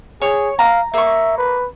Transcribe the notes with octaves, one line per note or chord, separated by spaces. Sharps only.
G#4 C#5
F5 A#5
A#3 E5 C#6
B4